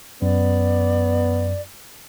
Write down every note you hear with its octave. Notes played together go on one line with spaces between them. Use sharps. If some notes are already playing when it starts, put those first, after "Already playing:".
F#2 B3 D5